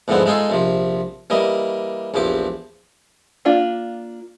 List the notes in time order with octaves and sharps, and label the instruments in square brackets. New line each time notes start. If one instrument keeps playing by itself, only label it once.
[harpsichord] E2 G#2 D3 F3 B3 C4
G#3 D#4 F4 G#4 A4
A#1 C3 F3
E3 G3 A#3 D#5
A#1 E2 F3 G4 D6
[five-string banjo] A#3 D4 F4